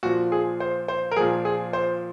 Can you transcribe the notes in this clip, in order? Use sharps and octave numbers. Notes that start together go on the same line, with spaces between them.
A#2 F3 F#4
G#4
C5
C5
A#4
A#2 F3 G#4
G#4
C5